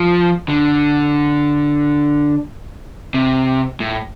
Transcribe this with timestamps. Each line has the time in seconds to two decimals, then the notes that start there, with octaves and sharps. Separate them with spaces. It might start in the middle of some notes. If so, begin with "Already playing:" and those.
Already playing: F3
0.49 D3
3.14 C3
3.80 A2